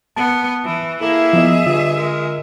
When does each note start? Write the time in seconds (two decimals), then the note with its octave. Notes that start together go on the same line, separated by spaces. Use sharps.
0.16 B3 A5
0.65 E3
1.01 A#3 E4 G#4 A4 E5
1.33 F3 B3 D#5
1.66 G2 D3 F4 D#5
1.97 G#3 A#4